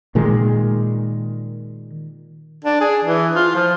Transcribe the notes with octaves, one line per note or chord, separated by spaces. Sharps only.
A#2 D#3 G#3
D4
G#4
E3
F4
F3